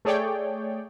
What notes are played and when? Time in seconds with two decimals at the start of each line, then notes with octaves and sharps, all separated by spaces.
0.05 A3 G#4 C#5 D5 G5